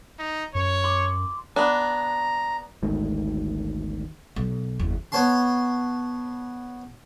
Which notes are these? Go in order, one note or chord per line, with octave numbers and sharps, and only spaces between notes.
D#4
F#2 C#5
C6 D6
B3 D4 A#5
G#1 D2 G#2
B1
F#1 E2
B3 C#5 A5 C6